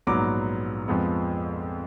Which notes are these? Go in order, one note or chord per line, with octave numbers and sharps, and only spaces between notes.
A#1 G#2 F#3 B3 A#5 D6
F2 F3 G#3 B3